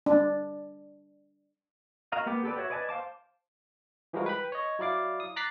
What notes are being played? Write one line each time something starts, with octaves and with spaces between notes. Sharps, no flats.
D4
F#4 A#4 D#5 F5 A#5
A#3 B3 G4 D6
G4 A4 B4 D5
F#4 C#5 E5
B4 D5 D#5 G#5 A5
C5 F5 A5 D6
E3 F3 G3 G#3 F#4 A#4
B4 G5 B5
C#5 D#5
F#3 E4 D5 F5 D6
D#6
A#5 D6 F#6 A6 B6 C7